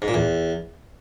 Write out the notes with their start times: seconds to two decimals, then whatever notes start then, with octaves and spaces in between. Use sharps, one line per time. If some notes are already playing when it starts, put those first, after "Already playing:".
0.02 G#2
0.08 A#2
0.14 E2